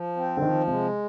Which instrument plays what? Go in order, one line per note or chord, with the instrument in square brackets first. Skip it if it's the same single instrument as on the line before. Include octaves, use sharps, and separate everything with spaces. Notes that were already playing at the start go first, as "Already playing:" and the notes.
Already playing: [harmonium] F3
C4
[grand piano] D3
[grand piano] D#3 [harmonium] F3
[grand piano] C3 [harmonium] G#3